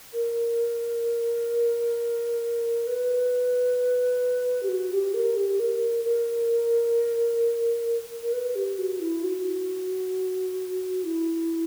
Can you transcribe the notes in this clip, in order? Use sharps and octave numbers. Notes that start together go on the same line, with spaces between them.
A#4
B4
G4
F#4
G4
A#4
G4
A#4
A#4
A#4
B4
G4
F#4
E4
F#4
E4